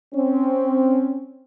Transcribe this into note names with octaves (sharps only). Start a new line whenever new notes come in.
C4 C#4